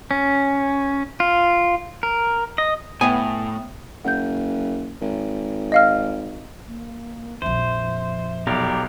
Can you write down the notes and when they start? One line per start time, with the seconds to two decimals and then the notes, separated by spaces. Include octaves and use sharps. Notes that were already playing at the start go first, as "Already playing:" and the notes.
0.11 C#4
1.20 F4
2.03 A#4
2.58 D#5
3.01 A2 B3 E5 G5 G#5 D#6
4.05 F#1 F#5 G6
5.01 G#1
5.72 D#5 F5 F6
6.68 A#3
7.42 A#1 F2 C5 E5
8.47 B1 G4 A#4 D5